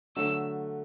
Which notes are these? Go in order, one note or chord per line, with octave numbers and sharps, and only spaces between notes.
D3 F#3 A3 E6